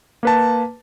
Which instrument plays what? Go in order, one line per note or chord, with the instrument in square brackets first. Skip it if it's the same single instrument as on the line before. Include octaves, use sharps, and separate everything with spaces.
[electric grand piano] A#3 B4 A5